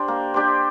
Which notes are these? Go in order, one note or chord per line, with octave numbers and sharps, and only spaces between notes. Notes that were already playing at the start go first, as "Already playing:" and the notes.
Already playing: D4 G4 C5
A#3
D4 G4 C5